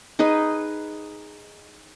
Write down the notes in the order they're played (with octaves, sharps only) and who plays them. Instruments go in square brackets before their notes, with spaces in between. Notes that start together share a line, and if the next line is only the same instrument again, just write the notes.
[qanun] D#4 G#4 B4 D#5